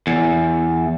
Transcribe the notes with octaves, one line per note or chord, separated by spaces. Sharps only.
E2